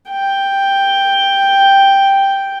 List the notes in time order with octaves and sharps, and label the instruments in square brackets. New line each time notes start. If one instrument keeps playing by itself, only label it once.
[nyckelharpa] G5